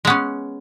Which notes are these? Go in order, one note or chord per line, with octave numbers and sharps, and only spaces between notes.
G#3 B3 C#4